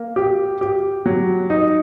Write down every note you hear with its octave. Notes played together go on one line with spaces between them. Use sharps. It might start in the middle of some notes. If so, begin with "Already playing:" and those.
Already playing: A#3
G4
G4
F#3
D#4